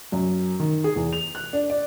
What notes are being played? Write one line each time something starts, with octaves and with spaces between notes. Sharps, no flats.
F#2
D#3
G#4
E2
F7
F#6
D4
D5